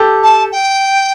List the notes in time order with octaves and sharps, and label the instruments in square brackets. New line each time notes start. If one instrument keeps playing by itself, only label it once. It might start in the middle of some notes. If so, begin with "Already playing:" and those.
Already playing: [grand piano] G4 A4
[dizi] A5
G5